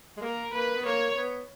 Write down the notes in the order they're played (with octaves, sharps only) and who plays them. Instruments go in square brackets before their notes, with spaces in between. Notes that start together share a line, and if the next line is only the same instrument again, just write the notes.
[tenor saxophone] G#3
[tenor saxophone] A#3 [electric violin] A#4
[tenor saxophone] A#3 [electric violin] B4
[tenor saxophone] B3
[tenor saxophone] A#3 [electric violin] C#5
[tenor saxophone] B3